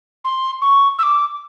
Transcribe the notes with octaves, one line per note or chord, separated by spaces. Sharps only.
C6
C#6
E6
D6